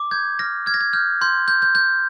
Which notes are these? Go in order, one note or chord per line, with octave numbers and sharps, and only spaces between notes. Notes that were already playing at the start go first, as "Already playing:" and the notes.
Already playing: D6
G6 G#6
F6 A#6
F6 G#6
A#6
G#6
F6 G6
C6 G6
G6
G6
G6